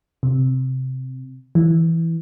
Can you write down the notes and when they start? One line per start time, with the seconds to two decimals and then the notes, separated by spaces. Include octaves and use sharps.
0.23 C3
1.55 E3